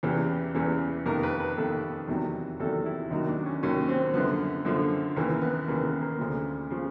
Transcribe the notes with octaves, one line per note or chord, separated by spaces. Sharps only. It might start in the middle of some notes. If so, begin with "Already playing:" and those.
E2 C#3 E3 G4
E2 C#3 E3
F2 C3 D#3 A#4
B4
B4
F2 C3 D#3 A4
E2 C3 D#3 F#3
E2 C3 D#3 F#3 A4
E4
D#2 D#3 F#3 D#4
D4
C#4
D#2 D#3 F#3 C#4
C4
F#2 D3 F3 B3
F#2 D3 F3
D#2 C#3 E3 A#3
B3
D#2 C#3 E3 A#3
B3
A#3
D2 C#3 F3
C#3 F3